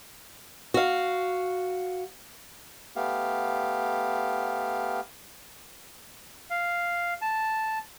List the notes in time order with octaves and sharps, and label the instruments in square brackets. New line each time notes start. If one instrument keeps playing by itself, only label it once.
[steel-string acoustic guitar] F#4 F5
[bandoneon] A3 B3 G4 F5
F5
A5